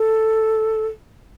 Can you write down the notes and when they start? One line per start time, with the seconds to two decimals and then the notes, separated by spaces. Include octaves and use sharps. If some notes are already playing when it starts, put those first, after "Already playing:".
Already playing: A4